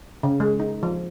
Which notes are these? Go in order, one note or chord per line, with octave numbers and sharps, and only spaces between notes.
C#3
G#3
D#4
F3